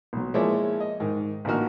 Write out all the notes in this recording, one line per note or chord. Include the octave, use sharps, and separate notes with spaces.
B1 F#3
F3 G#3 A#3 E4 C#5 D5
D#5
G#2 D#3
A1 D3 A#3 D#4 F#4 F6